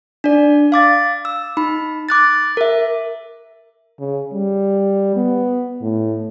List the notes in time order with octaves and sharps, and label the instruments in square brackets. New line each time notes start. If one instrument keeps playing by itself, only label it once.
[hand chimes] D4 D5
F5 D6 A6
E6
D#4 B5
D6 F#6 A6
A#4 E5
[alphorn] C#3
G3
B3
A2